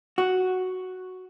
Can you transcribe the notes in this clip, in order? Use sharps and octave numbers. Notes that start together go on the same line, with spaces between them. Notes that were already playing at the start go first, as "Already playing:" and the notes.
F#4